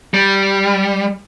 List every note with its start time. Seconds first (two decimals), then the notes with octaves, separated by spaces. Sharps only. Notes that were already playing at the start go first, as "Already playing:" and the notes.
0.14 G3